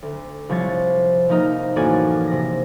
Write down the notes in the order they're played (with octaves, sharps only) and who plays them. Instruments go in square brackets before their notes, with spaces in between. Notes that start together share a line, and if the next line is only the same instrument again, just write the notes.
[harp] D2
C2 F3 C#5 A6
F3 A#3 D#4 A#4 D#5
A1 F#2 A#3 F#4 D5 G#5
C3 A#6